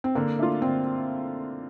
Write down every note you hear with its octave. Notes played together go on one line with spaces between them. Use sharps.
C4
D3 A#3
A3 D4 F4
D3 C4